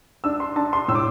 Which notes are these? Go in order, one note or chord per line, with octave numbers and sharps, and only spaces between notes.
D4 E6
C6
D4 A5
C6
A2 E6
D6